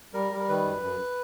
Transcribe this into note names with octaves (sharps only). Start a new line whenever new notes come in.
G3 A#4
G3
A#4
D#3 B4
F#2
F#2